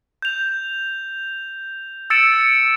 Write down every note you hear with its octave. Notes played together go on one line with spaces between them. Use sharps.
G6 F7
E6 A6 C#7 D7 E7